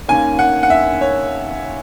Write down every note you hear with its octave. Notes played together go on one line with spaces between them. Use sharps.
D#2 D#3 A#3 C#4 G#5
F#5
F#5
E5
C#5